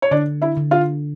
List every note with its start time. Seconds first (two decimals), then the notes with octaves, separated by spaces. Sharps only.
0.02 C#5
0.11 D3 D4 D5
0.42 E4 E5
0.57 D3
0.71 F4 F5